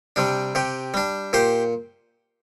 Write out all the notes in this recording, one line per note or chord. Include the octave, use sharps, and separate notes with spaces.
C3 G3 D4
C3 G4
G3 D4
A#2 G4 C5